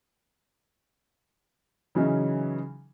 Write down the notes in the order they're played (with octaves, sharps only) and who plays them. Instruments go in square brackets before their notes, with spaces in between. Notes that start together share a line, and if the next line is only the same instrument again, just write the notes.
[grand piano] C#3 E3 F#3 C#4 D#4